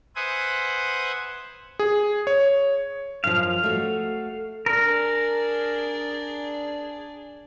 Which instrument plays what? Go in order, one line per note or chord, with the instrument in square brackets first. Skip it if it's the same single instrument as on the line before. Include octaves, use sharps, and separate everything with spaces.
[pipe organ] B4 C5 E5 F#5 G#5 D#6
[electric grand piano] G#4
C#5
[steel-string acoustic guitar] F#2 F3 [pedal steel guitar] F5
[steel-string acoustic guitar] A3 F#4
[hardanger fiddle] D4 G#4 [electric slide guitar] A#4